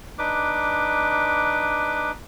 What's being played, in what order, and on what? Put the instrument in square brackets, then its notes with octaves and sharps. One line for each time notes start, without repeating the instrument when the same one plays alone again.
[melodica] D4 D#4 B4 D6